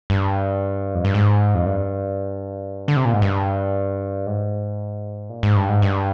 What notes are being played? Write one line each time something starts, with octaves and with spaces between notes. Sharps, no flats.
G2
F2
G2
G#2
F2
G2
D3
C3
A#2
G#2
G2
G#2
A#2
G#2
G2
G#2
G2